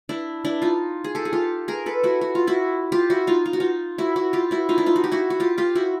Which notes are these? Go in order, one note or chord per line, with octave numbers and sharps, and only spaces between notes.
D4 E4
D4 E4
D#4 F4
G#4
G4 A4
G#4
F4 G4
G#4 A#4
A4 B4
E4 F#4
F#4
F4
E4 F#4
F4 G4
E4 F#4
D#4 F4
F4
F#4
D#4 F4
E4 F#4
E4 F#4
F4 G4
E4 F#4
D#4 F4
D4 E4
D#4 F4
F#4
G4
E4 F#4
F#4
F4 G4
F4 G4
E4 F#4